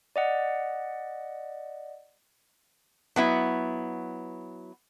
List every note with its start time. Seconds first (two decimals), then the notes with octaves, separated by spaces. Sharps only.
0.16 D5 D#5 F#5
3.16 F#3 B3 E4